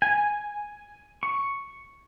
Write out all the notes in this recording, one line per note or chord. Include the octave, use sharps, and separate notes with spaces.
G#5
C#6